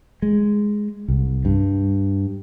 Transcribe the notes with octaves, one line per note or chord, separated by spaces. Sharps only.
G#3
C2
G2